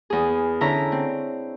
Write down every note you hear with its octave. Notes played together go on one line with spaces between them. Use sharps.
E2 G#4
D3 C#4 E4 A#5
C4